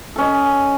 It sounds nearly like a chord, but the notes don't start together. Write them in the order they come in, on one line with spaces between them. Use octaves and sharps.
A4 C#4 D#5